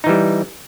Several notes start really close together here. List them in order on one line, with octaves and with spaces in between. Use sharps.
D#4 E3 G3